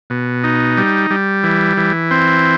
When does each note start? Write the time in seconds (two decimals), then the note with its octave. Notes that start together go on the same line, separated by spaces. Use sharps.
0.10 B2
0.44 D#4
0.78 G3
1.11 G3
1.44 E3
1.77 E3
2.11 C4